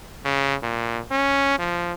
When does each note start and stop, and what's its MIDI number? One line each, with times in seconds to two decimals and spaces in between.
0.25 0.55 49
0.63 1.00 46
1.11 1.57 61
1.59 1.93 53